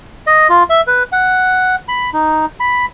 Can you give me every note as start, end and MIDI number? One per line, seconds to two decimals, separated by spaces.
0.27 0.48 75
0.49 0.63 65
0.70 0.81 76
0.87 1.03 71
1.12 1.76 78
1.89 2.10 83
2.13 2.46 63
2.60 2.85 83